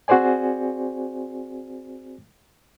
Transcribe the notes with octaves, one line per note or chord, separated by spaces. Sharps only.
C4 F#4 G#4 C5 D5 G#5